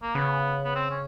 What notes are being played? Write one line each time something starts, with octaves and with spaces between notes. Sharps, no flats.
A#3
C#3 B3
B3
C4
C#4